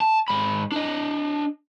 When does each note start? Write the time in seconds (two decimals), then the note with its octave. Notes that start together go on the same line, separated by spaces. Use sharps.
0.01 A5
0.28 G#2 B5
0.72 D4 D#5